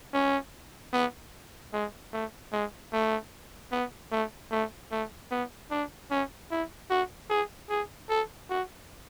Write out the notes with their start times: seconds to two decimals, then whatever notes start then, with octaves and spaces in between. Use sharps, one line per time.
0.13 C#4
0.93 B3
1.73 G#3
2.13 A3
2.52 G#3
2.92 A3
3.72 B3
4.11 A3
4.51 A3
4.91 A3
5.31 B3
5.71 D4
6.11 C#4
6.51 E4
6.90 F#4
7.30 G#4
7.69 G#4
8.09 A4
8.50 F#4